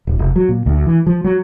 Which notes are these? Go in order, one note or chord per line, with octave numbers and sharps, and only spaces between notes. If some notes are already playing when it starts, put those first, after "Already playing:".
D1
F1
F#3
A#2
D2
E3
F3
F#3